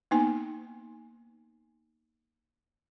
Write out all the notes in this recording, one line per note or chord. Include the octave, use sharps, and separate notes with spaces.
A#3 B3 D#4 G#5